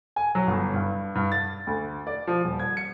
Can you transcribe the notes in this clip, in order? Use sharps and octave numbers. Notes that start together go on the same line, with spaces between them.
G#5
F#3
G1
G2
G2
A6
D2
D5
F3
D#1
G#6
C#7